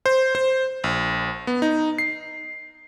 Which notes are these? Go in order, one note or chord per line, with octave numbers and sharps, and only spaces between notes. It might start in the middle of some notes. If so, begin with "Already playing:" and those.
C5
C5
A#1
B3
D#4
C7